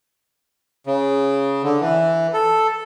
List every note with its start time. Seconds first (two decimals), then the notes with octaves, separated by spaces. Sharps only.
0.87 C#3
1.63 D3
1.81 E3
2.34 A4